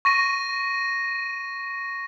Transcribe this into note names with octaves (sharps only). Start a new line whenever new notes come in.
C#6 A#6 D#7